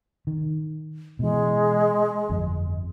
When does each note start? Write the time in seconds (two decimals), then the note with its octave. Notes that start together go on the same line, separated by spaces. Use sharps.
0.27 D#3
1.19 B2 E3 G#3
2.29 G1 F2